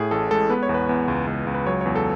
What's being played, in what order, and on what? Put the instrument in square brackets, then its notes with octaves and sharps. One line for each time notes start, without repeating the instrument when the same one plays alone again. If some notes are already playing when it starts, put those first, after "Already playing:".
Already playing: [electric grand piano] A2 G#4
A1 A4
G#3 A4
B3 B4
C#5
E2
B4
E2
C#2
C#2
C#2
B4
F#3 C#5
E2 C#5
A4